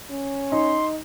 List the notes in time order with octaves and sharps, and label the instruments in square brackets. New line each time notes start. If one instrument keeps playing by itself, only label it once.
[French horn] C#4
[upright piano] D#4 [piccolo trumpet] C6